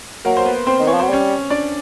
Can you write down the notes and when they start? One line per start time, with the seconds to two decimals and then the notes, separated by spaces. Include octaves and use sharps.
0.25 F#3 A#3 A#4
0.37 C5
0.45 B3 B4
0.67 C4 C5
0.80 D#3
0.87 E3 C#5
0.94 F3
1.00 F#3 C5
1.09 G3 C#4 C#5
1.50 D4 D5